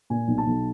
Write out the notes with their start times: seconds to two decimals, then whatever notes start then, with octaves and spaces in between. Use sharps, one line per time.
0.10 A#2 G#5
0.28 B1
0.38 A5
0.47 B1